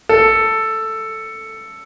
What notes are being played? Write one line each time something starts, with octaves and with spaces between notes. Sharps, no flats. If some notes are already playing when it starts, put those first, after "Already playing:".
A4